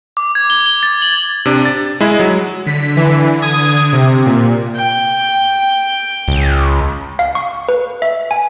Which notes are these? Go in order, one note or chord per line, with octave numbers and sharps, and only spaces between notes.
D6
G#6
G7
G7
A6
F#7
C3 D4
A6
G#3 E4
F#3
D3 B6
E3
D#6 G#6
C3
A#2
G5
C#2
F5
C#6
B4
E5
G#5